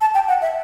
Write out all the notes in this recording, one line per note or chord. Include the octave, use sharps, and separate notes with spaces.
A5
G5
F#5
E5